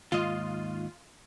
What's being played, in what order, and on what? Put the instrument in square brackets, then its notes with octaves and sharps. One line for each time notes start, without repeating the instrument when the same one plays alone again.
[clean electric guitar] D#2 G#2 D#5 [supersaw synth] F4